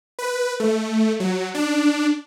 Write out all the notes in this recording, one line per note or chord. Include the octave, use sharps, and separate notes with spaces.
B4
A3
F#3
D4